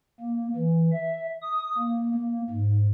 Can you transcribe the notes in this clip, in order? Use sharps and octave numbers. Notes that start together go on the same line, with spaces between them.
A#3
E3
E5
D#6
A#3
A#3
G#2